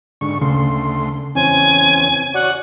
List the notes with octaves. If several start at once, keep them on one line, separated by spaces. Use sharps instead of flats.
G#2 D3 C#6
D2 C#3 A3 C6
E2 C4 C#4 G#5
F#4 C#5 D5 F#5